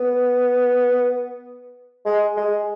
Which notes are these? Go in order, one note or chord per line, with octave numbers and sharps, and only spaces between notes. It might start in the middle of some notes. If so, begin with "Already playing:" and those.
Already playing: B3
G#3
G#3